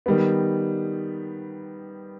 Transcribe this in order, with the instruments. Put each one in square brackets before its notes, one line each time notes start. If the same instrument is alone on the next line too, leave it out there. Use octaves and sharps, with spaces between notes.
[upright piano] D#3 G3 B3